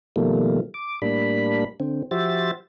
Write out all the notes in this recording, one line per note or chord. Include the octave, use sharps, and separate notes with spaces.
B2 D#3 F3 G3 A3 A#3
D6
A2 G3 A#3 D4 B5
D3 C4
F3 F#4 G4 C5 E5 A6